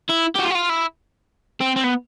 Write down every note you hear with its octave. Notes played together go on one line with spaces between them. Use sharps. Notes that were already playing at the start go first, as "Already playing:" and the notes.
E4
F#4 G4
F4
F#4
F4
E4
C4
C4
B3